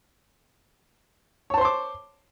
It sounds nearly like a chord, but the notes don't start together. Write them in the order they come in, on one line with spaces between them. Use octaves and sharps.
C#5 A5 C5 C6 D6